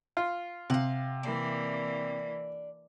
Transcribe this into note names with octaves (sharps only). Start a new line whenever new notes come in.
F4
C3 F5 F#5
E3 A#3 D4